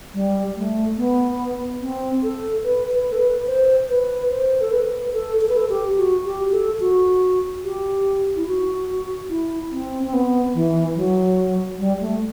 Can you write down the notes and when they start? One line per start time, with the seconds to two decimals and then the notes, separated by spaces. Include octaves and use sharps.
0.14 G3
0.56 A3
0.97 B3
1.81 C4
2.23 A4
2.64 B4
2.91 B4
3.12 A4
3.19 B4
3.47 C5
3.89 B4
4.30 C5
4.61 A4
4.71 B4
5.13 A4
5.41 A4
5.49 B4
5.57 A4
5.70 G4
5.97 F#4
6.25 G4
6.52 A4
6.80 F#4
7.64 G4
8.36 E4
8.47 F#4
9.29 E4
9.72 C4
10.03 C4
10.13 B3
10.54 E3
10.95 F#3
11.79 G3
12.00 A3